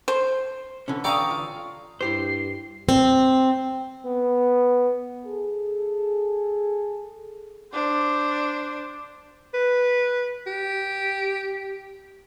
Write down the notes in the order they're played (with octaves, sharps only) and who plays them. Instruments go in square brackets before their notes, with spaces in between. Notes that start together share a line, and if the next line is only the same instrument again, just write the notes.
[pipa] C5
[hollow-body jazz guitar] D3 E3 C#4
[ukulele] A4 G5 A#5 [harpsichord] D5 F5 [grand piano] C#6 D#6
[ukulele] F4
[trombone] G2 [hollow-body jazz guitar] E4 G4 C5 [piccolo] C7
[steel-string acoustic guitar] C4
[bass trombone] B3
[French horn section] G#4 A4
[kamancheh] D4 C5
[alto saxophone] B4
G4